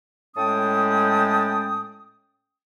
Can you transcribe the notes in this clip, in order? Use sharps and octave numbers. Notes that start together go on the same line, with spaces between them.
A2 G#3 C#4 G5 A5 D#6